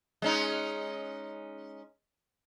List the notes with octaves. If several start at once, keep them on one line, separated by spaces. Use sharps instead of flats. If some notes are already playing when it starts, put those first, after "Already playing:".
G#3 C#4 D#4